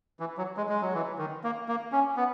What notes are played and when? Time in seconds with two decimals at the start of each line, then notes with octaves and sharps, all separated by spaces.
0.20 E3
0.37 F#3
0.57 G#3
0.69 G#3
0.81 F#3
0.94 E3
1.18 D#3
1.44 A#3
1.68 A#3
1.92 C#4
2.17 B3